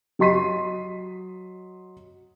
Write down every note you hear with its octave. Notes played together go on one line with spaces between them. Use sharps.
F#3 D#5 C6 B6 D#7